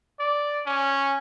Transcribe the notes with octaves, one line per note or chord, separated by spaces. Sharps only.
D5
C#4